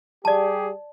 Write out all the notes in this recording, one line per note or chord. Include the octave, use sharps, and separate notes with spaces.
G3 G4 G#4 D5 A5